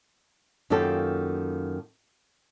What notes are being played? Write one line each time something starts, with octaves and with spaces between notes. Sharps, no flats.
F#2 D#3 A#3 F4 G4 A4